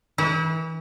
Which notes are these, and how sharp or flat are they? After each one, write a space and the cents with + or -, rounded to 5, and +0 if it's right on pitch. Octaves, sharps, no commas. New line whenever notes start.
E3 -30 E4 -35